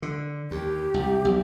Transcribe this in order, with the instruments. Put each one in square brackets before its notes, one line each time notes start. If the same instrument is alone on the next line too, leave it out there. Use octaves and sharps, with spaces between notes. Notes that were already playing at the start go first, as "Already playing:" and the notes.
[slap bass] D3
[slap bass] D#2 [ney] G4
[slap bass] C2
B1